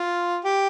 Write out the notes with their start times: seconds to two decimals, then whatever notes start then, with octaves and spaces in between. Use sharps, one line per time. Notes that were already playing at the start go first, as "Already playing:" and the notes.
Already playing: F4
0.44 G4